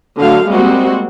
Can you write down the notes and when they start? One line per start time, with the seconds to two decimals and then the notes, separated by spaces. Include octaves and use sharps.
0.19 D3 F#3 A3 F5
0.49 G3 G#3 A#3 C4 F#4